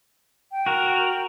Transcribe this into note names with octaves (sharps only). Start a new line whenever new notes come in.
G5
F#4 A#4